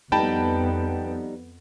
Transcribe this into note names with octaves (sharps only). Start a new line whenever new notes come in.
F2 G3 B3 D#4 G5 A5 B5